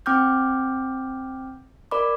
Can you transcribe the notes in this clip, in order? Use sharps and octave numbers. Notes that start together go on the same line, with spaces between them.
C4 G5 D6 F6 G6
A#4 D5 B5 D6